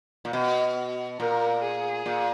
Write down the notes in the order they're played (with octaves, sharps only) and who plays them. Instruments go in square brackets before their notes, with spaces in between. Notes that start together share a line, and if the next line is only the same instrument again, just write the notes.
[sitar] A#2
B2
[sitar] A#2 [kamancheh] A#4
[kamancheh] G#4
[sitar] A#2